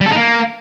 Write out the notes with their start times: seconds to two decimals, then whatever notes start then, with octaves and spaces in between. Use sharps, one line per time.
0.01 G3
0.06 A4
0.11 D#4
0.16 A#3